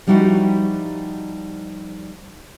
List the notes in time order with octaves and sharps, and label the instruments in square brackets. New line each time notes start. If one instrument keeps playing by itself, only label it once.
[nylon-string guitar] F3 G3 D#4 E4 F#4 G4